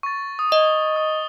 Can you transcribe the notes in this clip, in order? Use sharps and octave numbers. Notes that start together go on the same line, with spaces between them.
C#6 A6
D#6
D#5 G7
D#6